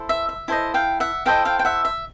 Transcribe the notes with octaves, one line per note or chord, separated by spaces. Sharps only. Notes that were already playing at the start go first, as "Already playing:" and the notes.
Already playing: E4 A4 C5
E5
E5
E4 A4 C5 D#5
F5 G5
E5 F#5
E4 A4 C5 D#5 F5 G5
F5 G5
G5
E5 F#5
E5